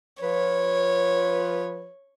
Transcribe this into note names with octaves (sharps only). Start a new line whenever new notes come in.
F3 F4 B4 C#5